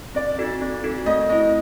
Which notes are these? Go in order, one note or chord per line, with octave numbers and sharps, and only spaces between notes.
C4 D5
D#4 F#4 A4
C4
D#4 F#4 A4
A3 D#5
C4 E4 D#5